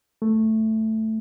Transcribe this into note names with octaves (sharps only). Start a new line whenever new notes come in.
A3